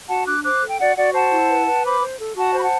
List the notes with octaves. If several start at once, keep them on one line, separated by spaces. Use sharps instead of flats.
F#4 F#5 A5
D4 D6 F#6
C5 D6 F#6
A4
G5
F#4 D5 F#5
F#4 D5 F#5
C5 F#5 A5
E4
B4
B4
C5 B5 D6
C5
A4
F#4 F#5 A5
C5 B5
F#5 A5